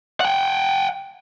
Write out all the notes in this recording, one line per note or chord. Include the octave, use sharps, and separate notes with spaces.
F#5 G5